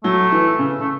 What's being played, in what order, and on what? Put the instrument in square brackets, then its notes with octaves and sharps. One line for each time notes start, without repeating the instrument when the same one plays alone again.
[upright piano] F#3 [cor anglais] A3
[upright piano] E3
C#3
[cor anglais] A3